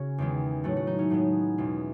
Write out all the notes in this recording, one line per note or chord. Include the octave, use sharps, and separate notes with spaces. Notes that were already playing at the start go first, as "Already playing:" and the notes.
Already playing: C#3 C#4 F#4
E2 D#3 G#3
A2 F#3 A3 F#4
F#4
D#4
C#4
A2 G#3 B3
E2 B2 G#3